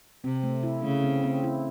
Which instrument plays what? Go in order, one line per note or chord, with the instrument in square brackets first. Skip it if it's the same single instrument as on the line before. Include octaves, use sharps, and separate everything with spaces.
[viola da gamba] C3 [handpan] C4
[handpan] A3
E4
[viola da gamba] C#3 [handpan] A3
[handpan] C4
C4
E4